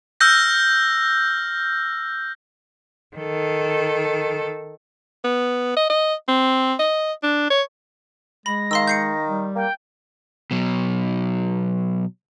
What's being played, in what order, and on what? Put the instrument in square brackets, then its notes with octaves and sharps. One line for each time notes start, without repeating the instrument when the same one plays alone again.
[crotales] E6 F6 G6 A#6
[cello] D#3 A4
[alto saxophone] B3
D#5
D#5
C4
D#5
D4
C#5
[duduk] G#3 [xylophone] B5 [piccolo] A#6
[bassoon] D#3 [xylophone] F5 C6 E6
[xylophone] G6 C7 C#7
[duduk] G3
[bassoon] A#3 [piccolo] G5
[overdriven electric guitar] B2 F#3